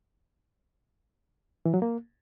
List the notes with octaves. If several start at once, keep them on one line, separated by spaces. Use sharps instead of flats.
E3
F#3
A#3